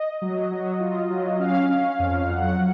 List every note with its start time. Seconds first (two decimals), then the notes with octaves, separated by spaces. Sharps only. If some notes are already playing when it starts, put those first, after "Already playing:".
Already playing: D#5
0.22 F#3
0.51 F#3
0.80 F4
1.10 F#3
1.39 C#4 F5
1.69 C#4
1.99 F2
2.28 F#3 F#5